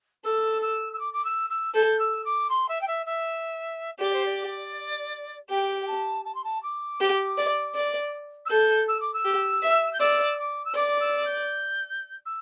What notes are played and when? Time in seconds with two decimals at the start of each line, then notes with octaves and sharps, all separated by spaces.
0.25 A4 E6
0.62 E6
0.93 E6
0.99 D6
1.13 D6
1.24 E6
1.50 E6
1.74 A4 G6
1.99 E6
2.25 D6
2.49 C6
2.68 E5
2.81 G5
2.87 E5
3.06 E5
4.00 G4 D5
4.13 C5
4.26 D5
5.50 G4 G5
5.81 G5
5.87 A5
6.25 A5
6.35 C6
6.44 A5
6.63 D6
7.00 G4
7.38 D5
7.75 D5
8.46 E6
8.50 A4 G6
8.88 E6
9.00 D6
9.14 E6
9.25 G4
9.62 E5
9.93 G6
10.00 D5 E6
10.38 D6
10.65 E6
10.75 D5 D6
11.00 E6
11.25 G6
12.26 E6